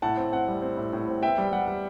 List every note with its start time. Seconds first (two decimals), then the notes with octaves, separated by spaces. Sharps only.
0.02 A2 F#5 A5
0.17 C4
0.32 C4 F#5
0.48 G3
0.62 C4
0.77 A2
0.93 A2
1.08 C4
1.22 B3 E5 G5
1.38 G3
1.53 G3 F#5
1.68 G3